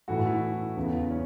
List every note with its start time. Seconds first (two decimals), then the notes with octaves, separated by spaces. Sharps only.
0.08 A2 E3 A3 F#4
0.25 E4
0.76 E2 C#3 E3
1.11 C#4